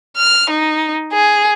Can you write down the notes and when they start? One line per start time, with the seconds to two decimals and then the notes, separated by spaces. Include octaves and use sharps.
0.17 F6
0.50 D#4
1.13 G#4